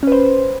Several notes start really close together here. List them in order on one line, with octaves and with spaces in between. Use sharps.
C#4 B4 C5